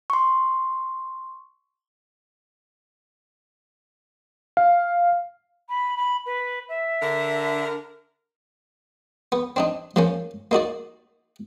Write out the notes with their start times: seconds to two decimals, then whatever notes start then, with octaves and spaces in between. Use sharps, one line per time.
0.10 C6 C#6
4.57 F5
5.67 B5
5.96 B5
6.25 B4
6.68 E5
7.02 D3 A#4
9.32 B3
9.56 C4 D4 D#4
9.96 F3 A#3 C#4
10.51 A#3 D#4 F#4 D5